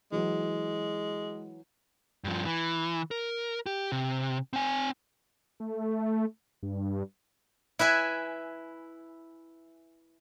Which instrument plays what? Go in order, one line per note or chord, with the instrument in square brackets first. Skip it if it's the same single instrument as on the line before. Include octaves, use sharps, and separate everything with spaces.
[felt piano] E3 F#3 [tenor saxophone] G#3
[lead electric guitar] G2 F3
E3
A#4
G4
C3
C4 G#5
[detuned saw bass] A3
G2
[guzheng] E4 B4 E5 G#5